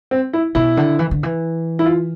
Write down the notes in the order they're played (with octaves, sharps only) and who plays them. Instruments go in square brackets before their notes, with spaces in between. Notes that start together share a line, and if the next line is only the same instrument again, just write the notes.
[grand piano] C4
E4
[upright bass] B2 [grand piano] E4
[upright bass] D3
E3
D3
E3
[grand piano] E4
F4